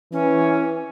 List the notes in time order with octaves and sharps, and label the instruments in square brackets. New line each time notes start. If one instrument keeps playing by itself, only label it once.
[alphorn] E3 [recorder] C#4